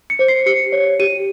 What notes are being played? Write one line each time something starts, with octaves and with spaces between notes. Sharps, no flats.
C#7
C5
C7
G4 C#7
C#5
G4 D#7